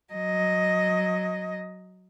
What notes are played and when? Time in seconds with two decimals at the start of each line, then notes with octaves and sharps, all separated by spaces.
0.13 F#3 D#5